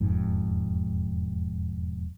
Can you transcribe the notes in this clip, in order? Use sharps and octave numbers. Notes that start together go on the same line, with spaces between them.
E1 F2 G#2